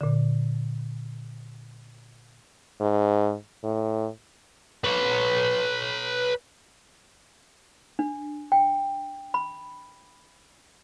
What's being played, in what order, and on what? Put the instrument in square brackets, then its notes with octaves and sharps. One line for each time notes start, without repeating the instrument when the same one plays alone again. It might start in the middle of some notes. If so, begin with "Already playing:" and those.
[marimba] A#2 D3
[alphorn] G#2
A2
[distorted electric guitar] B4 C#5
[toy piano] D4
G5
B5